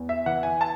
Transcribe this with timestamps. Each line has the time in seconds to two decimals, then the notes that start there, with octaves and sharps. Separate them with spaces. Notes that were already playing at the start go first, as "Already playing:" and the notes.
Already playing: E2
0.09 E5
0.26 E3 F#5
0.43 G#5
0.61 A5